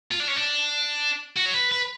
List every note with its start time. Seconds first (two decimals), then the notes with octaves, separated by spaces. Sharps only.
0.12 F4
0.20 D4
0.28 C#4
0.36 D4
1.36 F#4
1.46 C#5
1.54 B4
1.72 B4